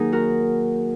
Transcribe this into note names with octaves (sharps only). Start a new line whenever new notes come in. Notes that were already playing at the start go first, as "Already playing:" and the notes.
Already playing: D#3 F#3 A#3 D#4 G#4
F#4 A#4